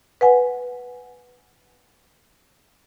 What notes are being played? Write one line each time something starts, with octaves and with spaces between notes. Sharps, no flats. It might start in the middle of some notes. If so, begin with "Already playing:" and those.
B4 F#5 G#5